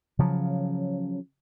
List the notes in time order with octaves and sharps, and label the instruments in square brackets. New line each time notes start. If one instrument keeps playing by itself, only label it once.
[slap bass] C#3 F3 F#3